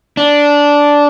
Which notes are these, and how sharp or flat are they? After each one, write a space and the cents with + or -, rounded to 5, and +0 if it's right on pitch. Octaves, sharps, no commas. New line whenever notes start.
D4 -10